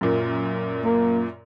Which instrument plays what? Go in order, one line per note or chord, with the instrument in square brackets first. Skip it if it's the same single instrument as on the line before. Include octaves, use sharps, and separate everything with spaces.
[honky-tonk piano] F#2 A#2
[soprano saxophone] A#3